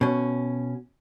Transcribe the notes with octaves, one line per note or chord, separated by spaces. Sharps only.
B2 C#4